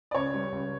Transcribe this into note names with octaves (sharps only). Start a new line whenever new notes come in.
D5
C#2 C#5
G3
C#2